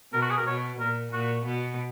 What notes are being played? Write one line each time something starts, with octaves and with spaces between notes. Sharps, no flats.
B2 A#4
F#4
G#4
A#4
B2 C#5
A#2 A#4
A#2 F#4
B2